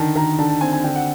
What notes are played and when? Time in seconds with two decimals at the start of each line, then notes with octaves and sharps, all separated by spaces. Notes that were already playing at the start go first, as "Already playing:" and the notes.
Already playing: D3 D#3 A5
0.15 D#3 A#5
0.39 D3 A5
0.50 A5
0.61 C4 G#5
0.73 G#5
0.84 D3 G5
0.96 F#5